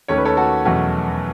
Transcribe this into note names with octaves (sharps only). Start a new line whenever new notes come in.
D#2 D#3 A3 C#4 C#5
B4
A4 C#5
F#4 A4
E2 B2 F#3 A3 C#4